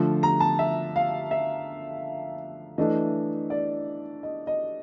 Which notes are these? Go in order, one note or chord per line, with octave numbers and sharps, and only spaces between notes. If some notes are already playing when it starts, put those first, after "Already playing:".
Already playing: D3 F3 A3
A#5
A5
E5
F5
E5
E3 A3 D4 D#5
D5
D#5
D#5